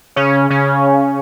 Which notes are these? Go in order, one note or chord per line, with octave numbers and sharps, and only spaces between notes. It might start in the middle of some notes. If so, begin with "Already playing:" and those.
C#3 C#4
C#3 C#4